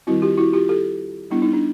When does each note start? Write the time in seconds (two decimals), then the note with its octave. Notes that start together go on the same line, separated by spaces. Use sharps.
0.07 D#3 G3 C4 E4 F#4
0.22 F4 G4
0.37 E4 F#4
0.53 F4 G4
0.69 G4 A4
1.31 G3 B3 D4 E4
1.42 D#4
1.53 D4